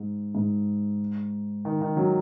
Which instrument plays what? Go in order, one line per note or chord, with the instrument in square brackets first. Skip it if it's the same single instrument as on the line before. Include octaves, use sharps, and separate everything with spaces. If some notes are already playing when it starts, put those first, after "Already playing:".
Already playing: [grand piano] G#2
G#2
D#3
D#3
F#3